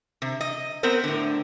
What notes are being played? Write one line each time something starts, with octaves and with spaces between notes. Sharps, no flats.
C3
D#5
B3 C4 A#4 C5
A2 D3